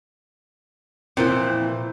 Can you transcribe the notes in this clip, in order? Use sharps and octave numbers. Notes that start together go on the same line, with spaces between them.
A#2 E3 F3 C4 E4